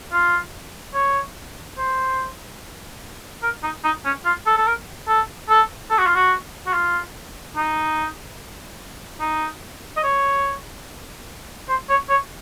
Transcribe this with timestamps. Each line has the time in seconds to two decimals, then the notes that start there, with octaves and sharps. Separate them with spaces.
0.12 F4
0.94 C#5
1.78 C5
3.43 A#4
3.63 D#4
3.84 D#4
4.05 C#4
4.25 F4
4.46 A4
4.57 A4
4.67 A#4
5.08 A4
5.49 A4
5.90 A4
5.98 F#4
6.06 F4
6.15 F#4
6.66 F#4
6.73 F4
7.56 D#4
9.21 D#4
9.97 D#5
10.04 C#5
11.69 C5
11.89 C#5
12.10 C#5